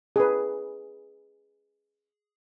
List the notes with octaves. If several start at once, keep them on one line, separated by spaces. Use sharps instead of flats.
G#4 B4